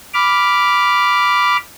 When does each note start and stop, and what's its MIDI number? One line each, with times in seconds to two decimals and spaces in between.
0.14 1.57 83
0.14 1.57 86
0.14 1.57 89